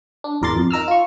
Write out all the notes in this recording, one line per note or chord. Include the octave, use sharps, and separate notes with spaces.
D4
G#1 E2 A#4 D5 C6 A6
F2
D#4 A#4 E6 F6
F4 C#6